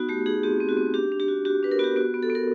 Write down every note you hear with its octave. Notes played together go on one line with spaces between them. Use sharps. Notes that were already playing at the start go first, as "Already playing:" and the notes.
Already playing: B3 D#4 F#4
A3 G4
D#4 G#4
C4 G4
C4
F#4
C4
D4 G4
D4
G4
F#4
F#4 G4
D4 B4
A#4
B3 F#4 G4
B3 F#4
B3
A4
B3
A#4